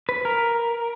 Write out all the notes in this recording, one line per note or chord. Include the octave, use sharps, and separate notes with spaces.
B4
A#4